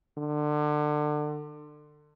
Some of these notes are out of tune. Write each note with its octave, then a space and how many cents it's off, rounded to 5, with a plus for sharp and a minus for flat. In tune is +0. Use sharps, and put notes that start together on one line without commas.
D3 +30